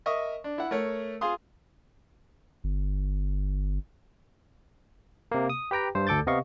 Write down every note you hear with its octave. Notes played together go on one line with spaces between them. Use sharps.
A#4 D#5 E5 C#6 D#6
D4
E4 F#5
A3 A#4 C#5
F4 G#4 F5 C6 D#6
G1
C3 A#3
D#6
G4 B4 G5 A#5
G2 C5
D2 A4 D6 G6 A6
C3 B3 D#5 F5 C#6